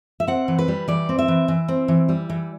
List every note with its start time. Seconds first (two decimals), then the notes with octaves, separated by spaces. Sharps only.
0.20 E5
0.27 C4 F#5
0.48 E3
0.59 B4
0.68 G3
0.88 E3 D5
1.09 C4
1.19 E5
1.28 E3
1.48 E3
1.68 C4
1.88 E3
2.09 G3
2.30 E3